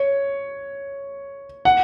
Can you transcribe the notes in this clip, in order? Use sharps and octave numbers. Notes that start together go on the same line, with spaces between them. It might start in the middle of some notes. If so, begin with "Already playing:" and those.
Already playing: C#5
F#5